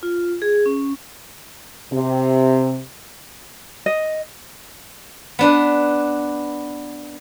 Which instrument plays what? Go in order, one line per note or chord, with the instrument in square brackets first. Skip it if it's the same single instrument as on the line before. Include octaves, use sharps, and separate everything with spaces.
[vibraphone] F4
G#4
C#4
[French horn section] C3
[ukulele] D#5
[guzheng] B3 D4 B4